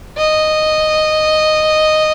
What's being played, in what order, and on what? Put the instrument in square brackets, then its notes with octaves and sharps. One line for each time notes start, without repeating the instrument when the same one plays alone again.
[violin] D#5